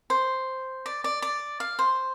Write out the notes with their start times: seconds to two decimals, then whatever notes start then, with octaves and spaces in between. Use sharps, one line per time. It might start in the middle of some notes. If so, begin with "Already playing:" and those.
0.10 C5
0.86 D5
1.04 D5
1.22 D5
1.60 F5
1.79 C5